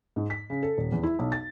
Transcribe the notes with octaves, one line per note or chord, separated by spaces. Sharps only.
G#2
B6
C#3
A4
D#1
E2
E4
B1
A6